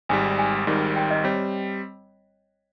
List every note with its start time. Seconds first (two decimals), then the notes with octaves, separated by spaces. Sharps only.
0.09 G#1 G#2 G3 G#5
0.39 G#5
0.67 G#1 G#2 D#3 G3
0.96 G5
1.10 D#5
1.24 G3 C4 C#5